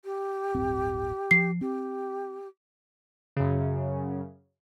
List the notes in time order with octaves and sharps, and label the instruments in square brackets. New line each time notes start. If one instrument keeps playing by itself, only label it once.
[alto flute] G4
[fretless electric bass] D1 G1 C4
[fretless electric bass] F3 [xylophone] C7
[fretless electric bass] C4 [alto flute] G4
[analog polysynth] F#2 C#3